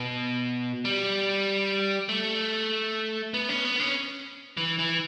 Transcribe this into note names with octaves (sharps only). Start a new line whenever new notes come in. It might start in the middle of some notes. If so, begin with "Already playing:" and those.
Already playing: B2
G3
A3
B3
C#4
B3
C#4
E3
E3